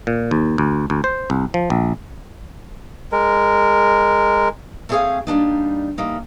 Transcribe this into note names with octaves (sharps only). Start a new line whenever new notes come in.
A#2
D#2
D2
D2
C5
C2
F3
A#1
G#3 A#4
A3 C4 C#4 G#4 C#5 F5
G3 A#3 D4 D#4
E3 G3 A#3 D#4